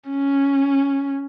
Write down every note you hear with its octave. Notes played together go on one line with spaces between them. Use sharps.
C#4